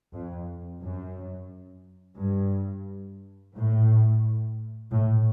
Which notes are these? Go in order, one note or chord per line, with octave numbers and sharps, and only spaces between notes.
F2
F#2
G2
A2
A2